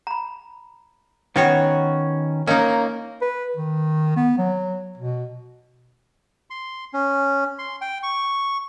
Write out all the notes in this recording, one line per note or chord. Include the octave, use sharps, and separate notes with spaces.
A#5 B5
D#3 B3 C#4 F#4 B4 C#5 G5
A#3 C#4 D#4 A#4 D#5
B4
D#3
B3
F#3
B2
C6
C#4
C6
G5
C#6